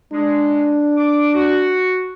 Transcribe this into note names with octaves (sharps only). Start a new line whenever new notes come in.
G#3 D4
D6
F#4